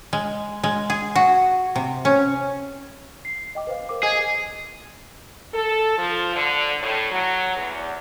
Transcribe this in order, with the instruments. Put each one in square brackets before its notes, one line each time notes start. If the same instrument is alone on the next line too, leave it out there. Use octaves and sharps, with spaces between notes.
[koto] G#3
G#3
G#4
F#4
C3
C#4
[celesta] C7
D#5 G5 D6
B4 C5 F5
A#4 D6
[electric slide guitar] G#4 [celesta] D#5 G#5 G#6
[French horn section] A4
F3
D3
A2
F#3
E2